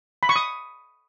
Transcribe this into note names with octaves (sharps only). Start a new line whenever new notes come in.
B5
C#6
D#6